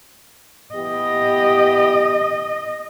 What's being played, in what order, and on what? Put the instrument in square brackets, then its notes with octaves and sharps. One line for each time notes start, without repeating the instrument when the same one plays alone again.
[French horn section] E3 B3 G4 [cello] D#5